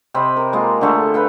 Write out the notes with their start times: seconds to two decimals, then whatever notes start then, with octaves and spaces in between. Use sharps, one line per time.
0.14 C3 C4 D#5 B5
0.36 A#4
0.53 G#3 A#3 F4
0.81 D3 A3 G#4
1.14 B4 F5 G5